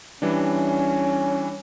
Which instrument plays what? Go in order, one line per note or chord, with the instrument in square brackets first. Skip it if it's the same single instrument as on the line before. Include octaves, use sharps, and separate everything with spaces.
[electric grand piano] E3 G3 D4 [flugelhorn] C#4